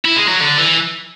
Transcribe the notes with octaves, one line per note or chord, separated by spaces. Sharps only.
E4
G#3
F#3
D3
E3